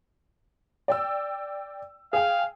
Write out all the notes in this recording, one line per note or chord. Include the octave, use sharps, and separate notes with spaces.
D5 G5 E6
G#4 F5 G5